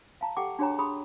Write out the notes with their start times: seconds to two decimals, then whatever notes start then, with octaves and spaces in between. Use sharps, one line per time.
0.21 F5 A5 A#5
0.37 G4 A4 F#5 G5 D6
0.59 D4 F#4 G#4 C#5 G5 A#5
0.79 G#4 B5 C6 D#6